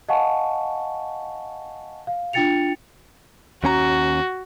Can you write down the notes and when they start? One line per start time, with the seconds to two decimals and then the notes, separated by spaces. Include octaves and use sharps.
0.09 D#5 F5 F#5 G#5 A5 C#6
2.07 F5
2.33 D4 F4 G5 A6 C#7 F7
3.64 D#2 C#4 F#4 A#5